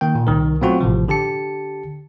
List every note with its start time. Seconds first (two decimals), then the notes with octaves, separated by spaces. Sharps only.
0.01 D#3 A#3 G5
0.15 A#2
0.27 C2 D#3 A#4
0.61 B2 F#3 A3 C4 F4 F#4
0.81 A1 A2 C3 F3
1.08 D3 G4 A5 C#7